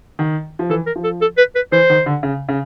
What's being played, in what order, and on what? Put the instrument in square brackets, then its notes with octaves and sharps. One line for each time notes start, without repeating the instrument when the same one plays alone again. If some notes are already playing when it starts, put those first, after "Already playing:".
[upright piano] D#3
F3
[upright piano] E3 [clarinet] A4
[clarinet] A#4
[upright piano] F3
[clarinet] A4
A4
B4
B4
[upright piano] E3 [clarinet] C5
[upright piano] D#3
D3
C#3
C#3